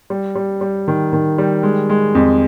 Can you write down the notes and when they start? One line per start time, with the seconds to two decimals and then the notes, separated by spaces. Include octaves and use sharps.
0.10 G3
0.35 G3
0.61 G3
0.88 D#3
1.13 D#3
1.38 G3
1.63 G#3
1.90 G#3
2.15 F2